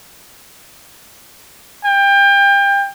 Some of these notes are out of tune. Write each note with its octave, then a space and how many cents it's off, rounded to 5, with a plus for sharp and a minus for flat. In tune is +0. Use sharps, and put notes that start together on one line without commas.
G5 +30